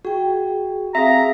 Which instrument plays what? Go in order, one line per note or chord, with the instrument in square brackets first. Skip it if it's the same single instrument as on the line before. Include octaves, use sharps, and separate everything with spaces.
[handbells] F#4 [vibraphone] G#4 G5
[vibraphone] C4 F5 [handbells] G#4 E5 [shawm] A#5